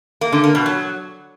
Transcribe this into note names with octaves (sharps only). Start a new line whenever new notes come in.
A#3
D3
A#3
B2
F#3